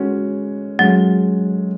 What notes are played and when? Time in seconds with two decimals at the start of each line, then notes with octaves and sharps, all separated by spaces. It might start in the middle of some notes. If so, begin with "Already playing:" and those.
Already playing: G#3 C#4 F#4
0.79 F#3 G#3 C#4 F#4